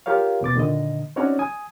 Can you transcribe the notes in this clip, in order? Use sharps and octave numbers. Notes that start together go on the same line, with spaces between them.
F4 G4 A#4 C#5 F5
D#2 B2 D6 A6
A#2 D3 D#3 D#5
C4 C#4 D#4 F#4 C#5 D5
G#5 D#6